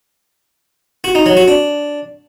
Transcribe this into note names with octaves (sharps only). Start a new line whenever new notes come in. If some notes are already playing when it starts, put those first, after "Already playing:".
F#4
D#4
F#3
F#4
D4